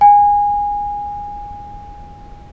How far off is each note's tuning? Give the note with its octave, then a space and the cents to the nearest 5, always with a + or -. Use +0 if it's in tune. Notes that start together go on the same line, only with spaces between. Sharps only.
G#5 -20